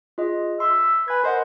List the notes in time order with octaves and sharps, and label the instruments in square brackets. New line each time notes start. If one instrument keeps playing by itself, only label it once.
[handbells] F4 G#4 D#5
[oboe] E5 [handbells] C6
[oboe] B4 [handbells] G#5 G#6
[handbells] A#4 D#5 F#5 [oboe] C5